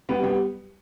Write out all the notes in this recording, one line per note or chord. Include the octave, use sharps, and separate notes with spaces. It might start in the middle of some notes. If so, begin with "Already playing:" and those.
G3 B3
G3 B3